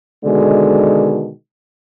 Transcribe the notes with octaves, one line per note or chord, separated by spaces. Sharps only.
B2 D3 D#3 G#3